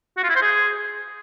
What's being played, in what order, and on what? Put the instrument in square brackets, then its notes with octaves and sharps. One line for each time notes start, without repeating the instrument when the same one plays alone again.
[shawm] F#4
F4
E4
C5
G#4